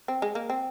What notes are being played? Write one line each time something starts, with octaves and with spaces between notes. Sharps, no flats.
C4
G#3
A#3
C4